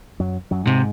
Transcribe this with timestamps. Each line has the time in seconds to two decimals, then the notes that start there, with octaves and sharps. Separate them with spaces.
0.20 F#2 F#3
0.51 F#2 F#3
0.67 G#2 C3 G#3